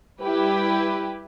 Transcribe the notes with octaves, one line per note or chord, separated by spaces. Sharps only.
G3 E4 G4 B4